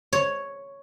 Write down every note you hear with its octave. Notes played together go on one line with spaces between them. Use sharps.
C#5